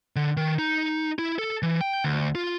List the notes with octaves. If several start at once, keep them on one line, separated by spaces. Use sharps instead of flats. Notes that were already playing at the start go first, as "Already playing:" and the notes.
D3
D#3
D#4
E4
A4
E3
G5
D2
F4